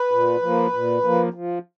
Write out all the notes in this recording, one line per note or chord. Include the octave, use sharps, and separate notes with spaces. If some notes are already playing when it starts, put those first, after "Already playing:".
Already playing: B4
A#2
F3 A#3
A#2
F3 A#3
F3